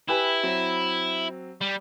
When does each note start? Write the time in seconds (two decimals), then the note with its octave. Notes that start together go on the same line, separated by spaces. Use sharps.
0.09 E4 G4 B4 G#5
0.43 F#3 C4
1.61 G3